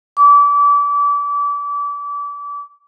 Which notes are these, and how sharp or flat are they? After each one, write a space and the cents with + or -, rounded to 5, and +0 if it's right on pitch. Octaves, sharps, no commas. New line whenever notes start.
D6 -30